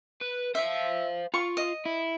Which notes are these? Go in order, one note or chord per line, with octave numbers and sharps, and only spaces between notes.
B4
C5 E5 F5
F4 C#6
D#5
E4